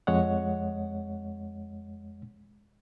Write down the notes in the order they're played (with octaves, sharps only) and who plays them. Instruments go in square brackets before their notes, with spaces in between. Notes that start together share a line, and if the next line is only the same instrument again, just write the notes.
[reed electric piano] F2 G#3 C#5 D#5 F#5